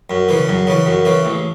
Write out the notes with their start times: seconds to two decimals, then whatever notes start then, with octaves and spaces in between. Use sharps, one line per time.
0.10 F#2
0.29 C#3 E3
0.48 F#2
0.67 C#3 E3
0.86 F#2
1.05 C#3 E3
1.25 A1